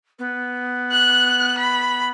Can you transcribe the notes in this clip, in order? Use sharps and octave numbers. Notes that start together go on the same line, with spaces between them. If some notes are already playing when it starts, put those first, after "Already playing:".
B3
F#6
B5